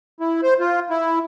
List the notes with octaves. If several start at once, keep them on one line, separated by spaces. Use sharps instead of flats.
E4
C5
F4
E4